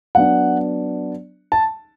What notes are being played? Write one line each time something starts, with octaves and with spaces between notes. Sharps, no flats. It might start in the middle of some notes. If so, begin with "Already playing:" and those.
F#3 B3 D4 F#5
A5